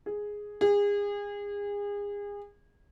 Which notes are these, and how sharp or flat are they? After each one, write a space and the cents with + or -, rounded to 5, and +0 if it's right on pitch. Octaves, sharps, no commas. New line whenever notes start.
G#4 +0
G#4 -30